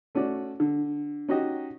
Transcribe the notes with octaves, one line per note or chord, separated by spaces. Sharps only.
A3 C#4 F#4 D5
D3
C#4 D#4 F#4 G4 D#5